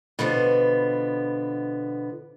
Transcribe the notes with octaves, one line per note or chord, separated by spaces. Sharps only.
B2 D3 F3 B3